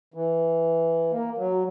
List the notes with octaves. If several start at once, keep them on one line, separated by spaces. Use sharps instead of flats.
E3
A#3
F#3